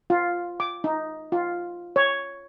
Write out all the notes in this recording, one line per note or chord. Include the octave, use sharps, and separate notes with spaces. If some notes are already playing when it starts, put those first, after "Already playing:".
F4
D6
D#4
F4
C#5